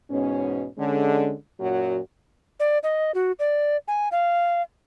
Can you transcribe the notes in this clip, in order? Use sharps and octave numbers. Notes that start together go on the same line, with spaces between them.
E2 G#2 B2 C#4
D3 G#3 C#4
F#2 A#2 F#3 F#4
D5
D#5
F#4
D5
G#5
F5